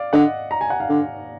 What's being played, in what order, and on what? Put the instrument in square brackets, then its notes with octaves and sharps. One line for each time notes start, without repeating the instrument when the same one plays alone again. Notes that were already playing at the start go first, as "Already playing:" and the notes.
Already playing: [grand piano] D5 F5
[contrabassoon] D3 [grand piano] D#5 F#5
[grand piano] A#5
G#5
F#5
F5 G#5
[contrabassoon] D3